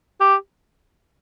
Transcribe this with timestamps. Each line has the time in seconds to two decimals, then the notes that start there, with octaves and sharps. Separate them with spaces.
0.21 G4